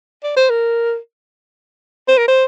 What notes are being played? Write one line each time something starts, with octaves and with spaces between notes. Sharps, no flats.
D5
C5
A#4
C5
A#4
C5